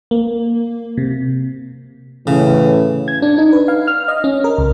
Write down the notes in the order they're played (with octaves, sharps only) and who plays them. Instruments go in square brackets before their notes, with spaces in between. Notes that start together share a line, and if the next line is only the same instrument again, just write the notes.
[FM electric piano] A#3
C3
[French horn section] A2 E3 [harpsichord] C#3
[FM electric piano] G#6
D4
D#4
B4
F5
F6
D#5
C#4
A#4
C#2